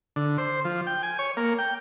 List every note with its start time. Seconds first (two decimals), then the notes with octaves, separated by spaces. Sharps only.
0.16 D3
0.38 C5
0.65 F3
0.87 G5
1.03 G#5
1.19 C#5
1.37 A#3
1.59 G5